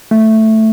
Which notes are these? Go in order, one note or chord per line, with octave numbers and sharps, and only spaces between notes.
A3